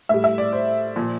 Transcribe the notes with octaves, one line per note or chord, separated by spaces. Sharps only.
A2 G3 E5
E5
D5
C5
A#2 F3